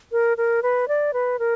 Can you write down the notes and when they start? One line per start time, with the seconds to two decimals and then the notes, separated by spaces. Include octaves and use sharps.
0.12 A#4
0.37 A#4
0.63 B4
0.88 D5
1.13 B4
1.39 A#4